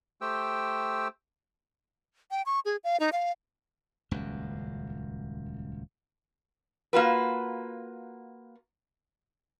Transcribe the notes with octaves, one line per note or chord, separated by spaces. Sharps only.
A3 G4 C5 G5 E6
G5
C#6
G#4
F5
D#4
F5
D#1 C#2 F#2
A#3 F4 F#4 B4